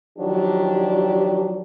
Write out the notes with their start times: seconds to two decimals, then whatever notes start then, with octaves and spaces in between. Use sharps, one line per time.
0.18 D#3 F3 F#3 D4 G4